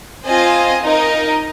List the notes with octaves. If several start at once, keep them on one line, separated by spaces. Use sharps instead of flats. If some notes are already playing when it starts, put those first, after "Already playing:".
C4 F4 C5 D#5 G#5
D#4 A#4 D#5